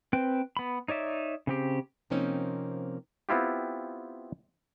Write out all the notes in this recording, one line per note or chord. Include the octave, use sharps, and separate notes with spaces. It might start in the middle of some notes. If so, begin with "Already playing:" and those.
C4 B4 G5
B3 B5
D#4 C#5 D5 E5
C#3 C4 G4
C3 F3 A#3 C4 C#4 D#4
B3 C4 E4 F4 G4